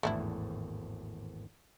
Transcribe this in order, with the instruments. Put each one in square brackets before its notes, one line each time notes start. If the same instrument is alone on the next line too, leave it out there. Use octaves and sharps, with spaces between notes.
[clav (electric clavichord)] G#1 E2 A2 [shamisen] A3 D4 E4